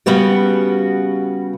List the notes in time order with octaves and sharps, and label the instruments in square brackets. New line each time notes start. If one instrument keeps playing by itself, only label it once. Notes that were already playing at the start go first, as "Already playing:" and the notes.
[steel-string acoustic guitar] C#3 G3 B3 F#4 G4